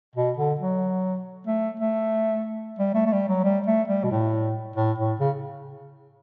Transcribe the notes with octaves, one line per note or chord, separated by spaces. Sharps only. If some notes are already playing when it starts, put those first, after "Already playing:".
B2
D3
F#3
A3
A3
G3
A3
A3
G3
F#3
G3
A3
G3
B2
A2
A2
A2
C#3